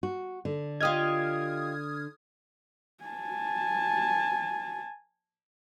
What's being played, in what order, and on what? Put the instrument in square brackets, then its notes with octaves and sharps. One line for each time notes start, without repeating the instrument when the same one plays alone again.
[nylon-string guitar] F#4
D3
[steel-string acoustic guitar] F4 G4 D#5 [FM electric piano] D#6 F6 G#6
[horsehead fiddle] G#5 A5